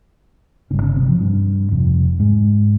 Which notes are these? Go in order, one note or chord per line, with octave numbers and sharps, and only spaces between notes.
G1 G2 C#3 C#4
C#3 C#4
C3 C4
G3
F3
G2 G3
F1 F2 C3
G#2 G#3